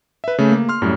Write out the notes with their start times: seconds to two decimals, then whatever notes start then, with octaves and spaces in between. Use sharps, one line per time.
0.24 B4 E5
0.38 C#3 A3
0.52 A#3
0.69 C6 F6
0.82 F#2 A2 G3